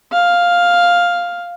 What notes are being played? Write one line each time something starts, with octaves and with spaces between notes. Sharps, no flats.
F5